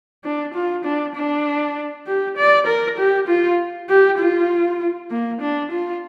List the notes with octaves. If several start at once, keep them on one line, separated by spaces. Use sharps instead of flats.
D4
F4
D4
D4
G4
D5
A#4
G4
F4
G4
F4
A#3
D4
F4